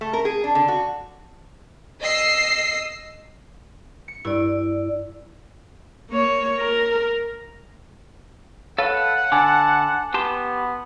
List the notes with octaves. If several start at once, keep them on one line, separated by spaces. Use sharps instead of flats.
A3
A#4
G#4
D4
D3
F#4
D#5 E6 C7
C#7
G2 E4 D5
A#3 C#5
A#4
A4 B4 C#5 F5 F#5
D3 G#5 A5 D6
B3 G4 A5 C6